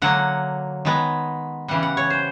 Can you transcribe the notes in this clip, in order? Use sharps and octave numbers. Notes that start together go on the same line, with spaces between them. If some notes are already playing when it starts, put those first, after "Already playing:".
D3 F#3 A#3 F#5
D#3 G#3 B3
C#3 E3 G3 F#5
F#5
C#5
C5